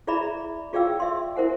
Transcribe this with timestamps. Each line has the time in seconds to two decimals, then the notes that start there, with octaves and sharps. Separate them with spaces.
0.07 E4 G#4 D5 E5 A#5 B5
0.73 F4 G#4 D5 F5 G5 E6
1.00 E5 C6
1.36 E4 A#4 C5 F#5 G#5